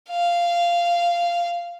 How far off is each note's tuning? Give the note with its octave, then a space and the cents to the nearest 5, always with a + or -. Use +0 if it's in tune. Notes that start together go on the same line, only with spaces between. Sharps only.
F5 -10